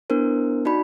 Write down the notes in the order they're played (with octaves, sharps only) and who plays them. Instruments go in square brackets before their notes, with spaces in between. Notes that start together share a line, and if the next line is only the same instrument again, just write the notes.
[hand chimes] B3 D4 E4 A#4 C5
D#4 F#4 D5 B5